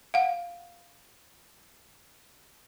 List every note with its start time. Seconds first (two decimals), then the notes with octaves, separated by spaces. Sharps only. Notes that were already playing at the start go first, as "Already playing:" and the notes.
0.14 F5 F#5